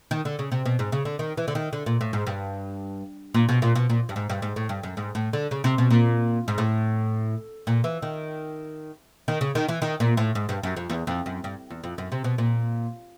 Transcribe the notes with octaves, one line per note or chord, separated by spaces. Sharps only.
D#3
D3
C#3
C3
B2
G#2
C#3
D3
D#3
E3
D3
D#3
D3
A#2
A2
G#2
G2
A#2
B2
A#2
B2
A#2
G2
G#2
G2
G#2
A2
G2
F#2
G#2
A2
D3
C#3
C3
B2
A#2
G#2
A2
A#2
E3
D#3
D#3
C#3
D#3
E3
D#3
A#2
A2
G#2
G2
F#2
F2
E2
F2
F#2
G2
E2
F2
F#2
C3
B2
A#2